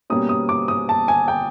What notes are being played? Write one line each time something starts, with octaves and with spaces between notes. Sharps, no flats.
B2 G3 A#3 C#4 D#6
D#6
D6
D#6
A5
G#5
G5